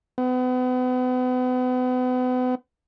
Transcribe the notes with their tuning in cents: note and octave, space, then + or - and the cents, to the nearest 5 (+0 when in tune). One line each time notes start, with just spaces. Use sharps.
B3 +35